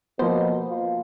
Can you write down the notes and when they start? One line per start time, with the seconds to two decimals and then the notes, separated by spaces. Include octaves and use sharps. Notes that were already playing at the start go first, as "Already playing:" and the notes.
0.19 B2 F3 A#3 B3 C5
0.70 F4